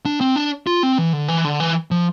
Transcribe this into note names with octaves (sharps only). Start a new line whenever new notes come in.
D4
C4
D4
F4
C4
E3
D3
E3
D3
E3
F3